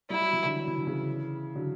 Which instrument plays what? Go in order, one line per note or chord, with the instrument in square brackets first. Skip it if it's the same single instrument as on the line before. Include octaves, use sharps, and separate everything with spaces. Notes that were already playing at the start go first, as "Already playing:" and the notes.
[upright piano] G3 [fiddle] E4
[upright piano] F#3
E3
D3 F#3
F#3
E3
D3
C#3 E3
D3 F#3